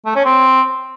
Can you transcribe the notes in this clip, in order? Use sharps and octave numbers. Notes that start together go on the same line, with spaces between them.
A3
C#4
C4